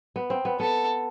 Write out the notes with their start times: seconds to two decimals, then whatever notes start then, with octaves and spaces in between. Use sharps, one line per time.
0.16 B3
0.30 C4
0.45 B3
0.60 B3 A4